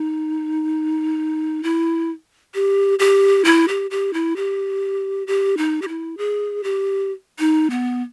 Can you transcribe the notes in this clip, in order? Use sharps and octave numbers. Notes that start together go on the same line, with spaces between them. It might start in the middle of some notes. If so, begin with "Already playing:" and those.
Already playing: D#4
E4
G4
G4
E4
G4
G4
E4
G4
G4
D#4
G4
E4
G#4
G4
D#4
B3